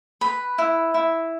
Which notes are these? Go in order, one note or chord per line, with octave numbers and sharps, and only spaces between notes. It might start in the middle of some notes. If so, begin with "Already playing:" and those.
B4 B5
E4
E4